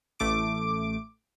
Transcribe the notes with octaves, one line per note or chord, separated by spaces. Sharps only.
A1 A3 D6 D7